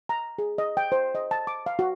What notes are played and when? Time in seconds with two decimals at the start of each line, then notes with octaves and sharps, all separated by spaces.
0.09 A#5
0.38 G#4
0.58 D#5
0.77 G5
0.92 C5
1.15 D#5
1.31 A5
1.47 D6
1.66 F5
1.79 F#4